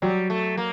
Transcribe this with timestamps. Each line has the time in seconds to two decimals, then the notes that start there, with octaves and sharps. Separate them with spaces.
0.02 F#3 G3
0.30 A3
0.57 A#3